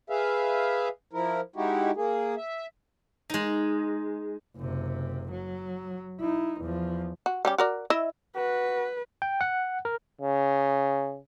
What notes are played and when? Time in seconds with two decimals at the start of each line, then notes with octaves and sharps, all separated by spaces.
0.10 G#4 B4 E5 F5
1.13 F3 E4 A#4
1.56 G#3 D#4 E4 F#4 G4
1.96 A#3 G#4
2.37 E5
3.30 G#3 D#4
4.56 F#1 C3
5.31 F#3
6.20 D#4 E4
6.61 E2 F3
7.26 F#4
7.45 G3 C#4 G4
7.58 F#4 A#4 D5
7.90 E4 D#5 E5
8.36 F#4 B4
9.22 G5
9.41 F#5
9.85 A#4
10.21 C#3